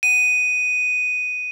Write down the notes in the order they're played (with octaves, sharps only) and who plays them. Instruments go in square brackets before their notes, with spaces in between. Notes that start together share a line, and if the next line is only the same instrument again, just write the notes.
[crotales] D#7